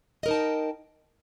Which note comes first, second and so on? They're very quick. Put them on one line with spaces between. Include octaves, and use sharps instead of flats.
D#5 A#4 D#4 A5 G5